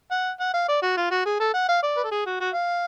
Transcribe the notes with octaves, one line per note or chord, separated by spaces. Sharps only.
F#5
F#5
F5
D5
F#4
F4
F#4
G#4
A4
F#5
F5
D5
B4
A4
G#4
F#4
F#4
F5